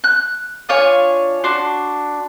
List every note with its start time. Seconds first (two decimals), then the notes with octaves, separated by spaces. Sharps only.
0.04 F#6
0.69 D4 F4 C#5 G#5
1.44 D4 F#4 C6